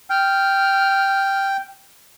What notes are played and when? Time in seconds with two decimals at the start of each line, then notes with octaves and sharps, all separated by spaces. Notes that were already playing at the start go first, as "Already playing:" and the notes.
0.10 G5 F6